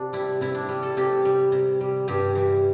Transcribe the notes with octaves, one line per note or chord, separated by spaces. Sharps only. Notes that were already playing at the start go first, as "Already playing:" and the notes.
Already playing: C3 D4
G3 E4
C3 E4
D4
G3
A4
C3 G4
G3
C3
G3
G2 G4
E3 G3